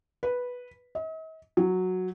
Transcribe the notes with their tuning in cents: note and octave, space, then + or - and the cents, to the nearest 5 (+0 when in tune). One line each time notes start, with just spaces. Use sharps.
B4 -5
D#5 +45
F#3 -5